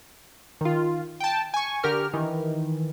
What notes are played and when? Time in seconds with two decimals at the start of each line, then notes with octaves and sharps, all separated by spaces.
0.61 D#3 F4
1.20 G5 A5
1.54 G#5 C#6
1.83 D3 G4 A#4 F6
2.14 D#3 E3